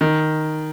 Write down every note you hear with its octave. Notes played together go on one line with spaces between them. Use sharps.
D#3